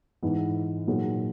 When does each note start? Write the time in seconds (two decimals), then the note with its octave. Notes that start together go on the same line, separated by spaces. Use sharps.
0.23 G#2 E3 B3 D#4
0.87 A#2 F#3 B3 D#4 G#4